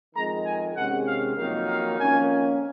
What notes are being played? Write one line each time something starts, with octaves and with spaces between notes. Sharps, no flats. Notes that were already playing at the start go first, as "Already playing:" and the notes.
F2 D#3 G#3 A#5
G#5
C3 D#3 G#3 C#4 F#5
F5
F2 D#3 F#3 A#3 D#4 F5
F5
F2 D#3 A#3 C#4 G#5